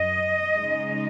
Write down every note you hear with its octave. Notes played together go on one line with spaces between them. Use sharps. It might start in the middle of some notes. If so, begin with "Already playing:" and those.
Already playing: F#2 D#5
C#3 G#3 D#4